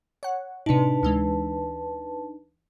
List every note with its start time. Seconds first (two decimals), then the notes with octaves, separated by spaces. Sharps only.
0.23 C#5 F#5
0.66 A2 C3 D4 D#4 B4 A5
1.03 D2 E3 G#3